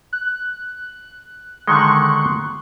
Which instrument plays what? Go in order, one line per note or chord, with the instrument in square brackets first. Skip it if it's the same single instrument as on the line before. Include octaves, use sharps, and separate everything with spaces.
[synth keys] F#6
[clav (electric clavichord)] D3 D#3 G#3 [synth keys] C6 F#6 [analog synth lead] C#6